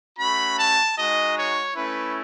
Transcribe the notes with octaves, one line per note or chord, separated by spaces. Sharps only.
A3 C#4 F#4 B5
A5
G#3 D#4 F#4 D#5
C#5
A3 C#4 E4 B4